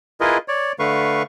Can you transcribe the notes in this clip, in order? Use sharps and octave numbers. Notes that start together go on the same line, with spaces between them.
E4 F4 G#4 A#4 B4 D#5
C#5 D5
D3 A3 B4 F5 C#6